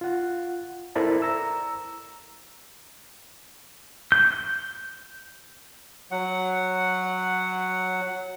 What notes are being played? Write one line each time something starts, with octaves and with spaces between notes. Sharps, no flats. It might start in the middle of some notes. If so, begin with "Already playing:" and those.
F4 F#5
E4 A4 A#4 C5 D5
A#5 E6
G6
F#3 F#5